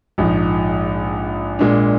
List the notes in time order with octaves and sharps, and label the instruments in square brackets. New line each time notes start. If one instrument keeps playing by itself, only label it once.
[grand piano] A#1 G#2 F3
A#2 G#3 D4